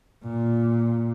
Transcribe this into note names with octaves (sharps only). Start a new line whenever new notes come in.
A#2